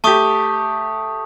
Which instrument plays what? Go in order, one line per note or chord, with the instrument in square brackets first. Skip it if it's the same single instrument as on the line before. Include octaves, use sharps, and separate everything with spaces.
[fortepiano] A3 G4 [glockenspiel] A5 C#6 D#6